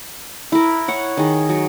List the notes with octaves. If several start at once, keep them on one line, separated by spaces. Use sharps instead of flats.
E4 A#4
C#5 F#5
D#3 G#4
F#3